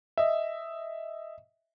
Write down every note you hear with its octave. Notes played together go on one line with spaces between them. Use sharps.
D#5 E5